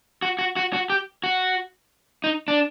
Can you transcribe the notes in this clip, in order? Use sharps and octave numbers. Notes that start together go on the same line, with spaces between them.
F#4
F#4
F#4
F#4
G4
F#4
D#4
D4